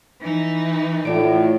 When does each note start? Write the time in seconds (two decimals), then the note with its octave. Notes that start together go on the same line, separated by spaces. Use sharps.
0.21 E3 D#4
1.05 A2 F4 D5 D7